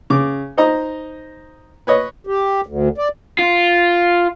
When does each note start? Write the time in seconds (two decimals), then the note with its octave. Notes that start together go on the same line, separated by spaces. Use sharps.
0.10 C#3 D6
0.57 D#4 C5 D#5 A#5
1.87 B4 C#5 D#5
2.27 G4
2.66 D2
2.98 D5
3.39 F4